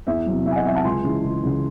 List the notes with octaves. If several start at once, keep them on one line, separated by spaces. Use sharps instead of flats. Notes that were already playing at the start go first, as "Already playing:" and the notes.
E2 E5
F#3
C3
E2 E5
G#5
D#5 F#5
C3 F#3 E5 G#5
F#5 A5
C#2 G#5 C6
C#3 E3
C#2
C#3 E3